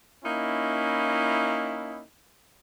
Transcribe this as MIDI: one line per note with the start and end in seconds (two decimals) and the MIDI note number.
0.23 2.01 58
0.23 2.01 61
0.23 2.01 63
0.23 2.01 64